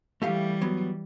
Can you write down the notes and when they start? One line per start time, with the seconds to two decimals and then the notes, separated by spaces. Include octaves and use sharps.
0.22 E3 G3 A3 G4 F5
0.61 F#3 B3